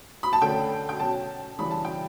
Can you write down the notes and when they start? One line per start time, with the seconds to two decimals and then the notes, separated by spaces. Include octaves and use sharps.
0.23 B5
0.33 A5
0.42 D3 A3 C#4 G5
0.89 G5
0.99 B2 F#3 C#4 A5
1.59 C#3 E3 G3 D4 B5
1.71 A5
1.85 G5